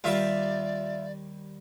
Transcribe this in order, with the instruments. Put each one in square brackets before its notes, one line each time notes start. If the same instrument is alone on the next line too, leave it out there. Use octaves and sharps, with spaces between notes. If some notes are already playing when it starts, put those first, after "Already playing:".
[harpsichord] D#2 G3 [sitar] F4 E5 [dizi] D5